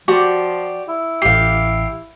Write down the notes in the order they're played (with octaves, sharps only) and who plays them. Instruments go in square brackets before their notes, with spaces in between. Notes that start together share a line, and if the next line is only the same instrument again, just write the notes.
[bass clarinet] F3 [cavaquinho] F#4 G4 D5
[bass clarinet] E4
[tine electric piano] A1 C7 [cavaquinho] G4 F5